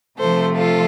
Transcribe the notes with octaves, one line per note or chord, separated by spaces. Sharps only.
C3 F3 A3 A4 C5
F4 A4